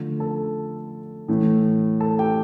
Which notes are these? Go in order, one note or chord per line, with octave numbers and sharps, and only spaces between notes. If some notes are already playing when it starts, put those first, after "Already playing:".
Already playing: D3 F3 A3
A4 A5
A2 E3 A3
A4 A5
G4 G5